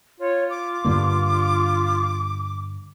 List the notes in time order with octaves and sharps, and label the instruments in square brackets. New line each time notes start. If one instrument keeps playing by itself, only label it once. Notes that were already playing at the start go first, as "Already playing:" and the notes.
[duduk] F4 [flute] C#5
[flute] D6
[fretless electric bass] G2 D3 A#3